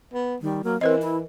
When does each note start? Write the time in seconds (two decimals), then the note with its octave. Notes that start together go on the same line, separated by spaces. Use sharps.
0.14 B3
0.42 D#3 G3
0.64 F#3 A#3
0.81 E3 C4 A#4 B4 D#5
1.02 E4